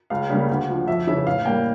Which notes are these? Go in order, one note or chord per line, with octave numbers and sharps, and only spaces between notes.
C#2 F5
C#3 G3 A#3 C#4
D2
D3 F3
F2 E5
C#3 E3 E5
A2 F5
G3 A#3 G5